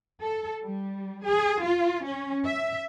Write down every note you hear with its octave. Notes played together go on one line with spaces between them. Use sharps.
A4
G3
G#4
F4
C#4
E5